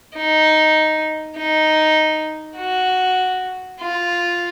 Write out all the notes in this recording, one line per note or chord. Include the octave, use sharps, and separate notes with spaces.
D#4
D#4
F#4
F4